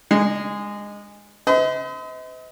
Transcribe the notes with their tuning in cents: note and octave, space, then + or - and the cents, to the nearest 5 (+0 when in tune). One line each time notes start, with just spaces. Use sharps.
G#3 -15 D4 +25
C5 -45 D#5 +40